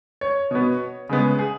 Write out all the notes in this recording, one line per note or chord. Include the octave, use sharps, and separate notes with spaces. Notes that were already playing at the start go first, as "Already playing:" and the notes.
C#5
B2 B3
C#3 G#3 B3
G#4